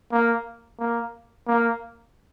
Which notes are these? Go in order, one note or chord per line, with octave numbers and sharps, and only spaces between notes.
A#3
A#3
A#3